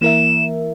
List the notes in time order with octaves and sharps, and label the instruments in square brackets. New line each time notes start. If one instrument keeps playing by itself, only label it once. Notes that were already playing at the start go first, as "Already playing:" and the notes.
[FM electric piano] E3 A#3 E4 A#4 E5 [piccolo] E7